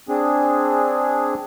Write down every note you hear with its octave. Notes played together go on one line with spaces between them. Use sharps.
C4 D4 G#4